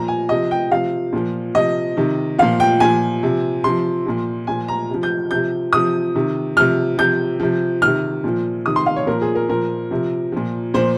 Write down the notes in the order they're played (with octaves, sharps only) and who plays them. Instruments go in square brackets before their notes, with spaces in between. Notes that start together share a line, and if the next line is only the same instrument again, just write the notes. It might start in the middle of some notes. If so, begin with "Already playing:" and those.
Already playing: [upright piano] A#2 F3 A#5
G#5
C3 F3 D#5
G5
C3 F3 F5
A#2 F3
C3 F3 D#5
C3 D#3
A#2 F3 F5
G5
A#2 F3 G#5
C3 F3
C3 F3 C6
A#2 F3
A#2 F3 G#5
A#5
C3 F3
G6
C3 F3 G6
C3 F3 D#6
C3 D#3
C3 F3 F6
C3 F3 G6
C3 F3
C3 D#3 F6
A#2 F3
C3 D#3 D#6
C6
F5
C#5
A#2 F3 A#4
G#4
A#4
A#2 F3 A#4
C3 F3
A#2 F3
A#2 F3 C5